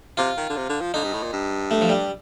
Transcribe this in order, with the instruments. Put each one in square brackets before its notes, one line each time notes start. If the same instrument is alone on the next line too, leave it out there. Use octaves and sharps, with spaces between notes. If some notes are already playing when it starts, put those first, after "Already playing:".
[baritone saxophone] C3 [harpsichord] F4
[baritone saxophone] D#3
D3
C3
D3
F3
[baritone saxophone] D3 [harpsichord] D#4
[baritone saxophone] G2
A2
A#2
G2
[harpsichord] A3
F3
G3